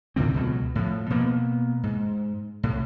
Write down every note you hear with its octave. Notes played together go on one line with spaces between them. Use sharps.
A2 D3 E3 C4
C#2 B2 F#3
A2 F3
B2 A#3 B3
G#2
C2 A2